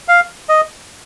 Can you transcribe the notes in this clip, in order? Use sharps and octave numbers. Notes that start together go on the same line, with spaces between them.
F5
D#5